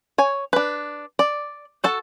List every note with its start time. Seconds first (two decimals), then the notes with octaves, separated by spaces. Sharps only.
0.18 C#5 G#5
0.53 D4 B4
1.19 D5
1.84 F#4 A4 A5